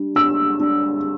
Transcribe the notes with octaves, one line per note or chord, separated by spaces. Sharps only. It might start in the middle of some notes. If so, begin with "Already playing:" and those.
Already playing: G3 D4
D4 E6
D4